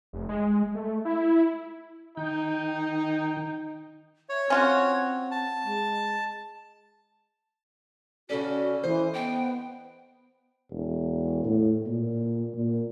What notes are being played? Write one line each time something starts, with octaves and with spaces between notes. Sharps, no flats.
F1
G#3
A3
E4
D#3 D#4 G5
C#5 E5
C4 C#4 F4 F#4
A5
G#3
C#3 C#4 F#4 A4 D5
E3 C5 D#5
B3 G5
E1
A2
A#2
A#2